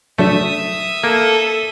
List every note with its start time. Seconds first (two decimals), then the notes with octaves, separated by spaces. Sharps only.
0.18 C#3 F#3 A3 D4 E5 D#6
1.04 A#3 A4